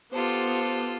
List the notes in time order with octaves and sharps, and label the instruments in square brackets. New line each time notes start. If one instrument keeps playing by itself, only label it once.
[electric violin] B3 G4 [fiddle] F4 A4 [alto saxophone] C5